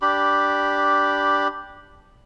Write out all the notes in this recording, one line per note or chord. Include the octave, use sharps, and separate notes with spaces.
D4 G4 B5